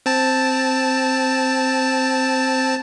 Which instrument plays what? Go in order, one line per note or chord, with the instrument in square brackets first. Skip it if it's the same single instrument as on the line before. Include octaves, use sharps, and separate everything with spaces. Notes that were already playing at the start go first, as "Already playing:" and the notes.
[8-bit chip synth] C4 A5